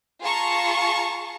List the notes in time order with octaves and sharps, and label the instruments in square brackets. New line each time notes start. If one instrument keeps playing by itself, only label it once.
[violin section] F4 G#4 A5 A#5 C#6